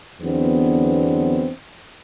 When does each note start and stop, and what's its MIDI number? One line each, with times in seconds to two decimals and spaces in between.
0.21 1.50 40
0.21 1.50 50
0.21 1.50 54
0.21 1.50 59
0.21 1.50 60
0.21 1.50 62